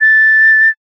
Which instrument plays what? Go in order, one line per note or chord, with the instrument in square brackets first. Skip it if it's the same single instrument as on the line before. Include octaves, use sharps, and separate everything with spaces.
[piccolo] A6